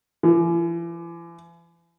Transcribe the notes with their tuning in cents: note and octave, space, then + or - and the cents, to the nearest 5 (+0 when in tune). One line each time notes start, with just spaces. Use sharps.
E3 +45